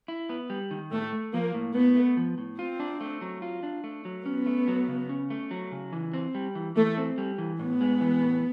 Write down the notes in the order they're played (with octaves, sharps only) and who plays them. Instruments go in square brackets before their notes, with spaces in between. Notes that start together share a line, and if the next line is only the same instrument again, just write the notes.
[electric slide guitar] E4
B3
G3
D#3
[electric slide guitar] A2 [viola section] A3
[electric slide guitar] A3
[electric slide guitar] F3 [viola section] A#3
[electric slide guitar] A2
[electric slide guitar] A2 [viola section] B3
[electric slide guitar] A3
F3
A2
[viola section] C4 [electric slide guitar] F4
[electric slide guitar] D4
A3
F#3
F4
D4
A3
F#3
[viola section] B3 [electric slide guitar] C#4
[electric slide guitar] A3
F#3
C#3
C#4
A3
F#3
C#3
E3
C4
G3
E3
[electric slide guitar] E3 [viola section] A3
[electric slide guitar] C4
G3
E3
[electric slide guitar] A2 [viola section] B3
[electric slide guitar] G#3
E3
A2